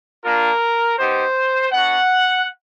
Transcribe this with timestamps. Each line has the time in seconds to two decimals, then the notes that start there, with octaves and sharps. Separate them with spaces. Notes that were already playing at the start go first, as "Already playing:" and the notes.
0.24 A#3 D4 F4 A#4
0.98 B3 D#4 G4 C5
1.71 B3 D4 F#4 F#5